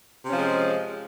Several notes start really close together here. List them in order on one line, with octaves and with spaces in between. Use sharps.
C3 C#4 F3 G#3